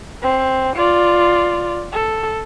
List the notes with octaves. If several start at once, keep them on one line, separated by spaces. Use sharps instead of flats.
C4
F4 D5
A4